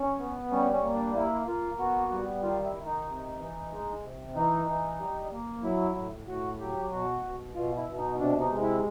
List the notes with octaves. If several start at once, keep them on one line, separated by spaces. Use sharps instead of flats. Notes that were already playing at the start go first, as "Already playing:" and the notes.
Already playing: C#4
B3
G3 C#4
C#4
A#3
D4
A#3 E4
A#3 F4
B3 F#4
G3
D#3 F4
E4
D#3
D#4
C3
E3
G#3
C3
E3 D#4
E3
G3
A#3
F#3 E4
A2
A2 F#4
F#3 G4
B2 F#4
B2
B2 F4
E4
B2
D#4
C3 D4
D#4
G#3
E4